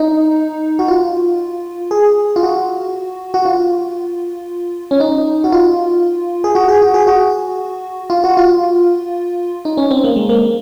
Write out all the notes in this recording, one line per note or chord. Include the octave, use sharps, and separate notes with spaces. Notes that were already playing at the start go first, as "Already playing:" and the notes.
Already playing: D#4
F#4
F4
G#4
F4
F#4
F#4
F4
C#4
D#4
F#4
F4
G#4
F#4
G#4
F#4
G#4
F#4
F4
F#4
F4
D#4
C#4
C4
A#3
G#3
A#3